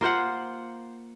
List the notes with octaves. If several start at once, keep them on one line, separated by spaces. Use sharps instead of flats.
A#3 F4 C5 F#5